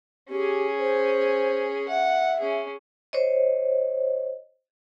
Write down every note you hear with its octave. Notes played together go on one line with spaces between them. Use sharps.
C#4 G4 G#4
C5
E5 F#5
C#4 G#4
C5 C#5 D#5